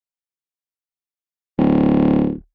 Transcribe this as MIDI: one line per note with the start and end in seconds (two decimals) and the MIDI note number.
1.58 2.34 26